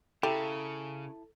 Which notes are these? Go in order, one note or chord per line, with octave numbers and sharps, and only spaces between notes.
C#3 E4 G4 A4 A5 A#5